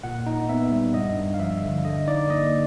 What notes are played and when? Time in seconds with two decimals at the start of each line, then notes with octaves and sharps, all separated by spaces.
0.03 A#2 F#5
0.26 D#4
0.49 B3 E5
0.71 G3
0.94 G2 D#5
1.17 G2
1.34 F5
1.39 F3 E5
1.62 D3
1.85 D3 D#5
2.07 D#4 D5
2.30 A#3 D#5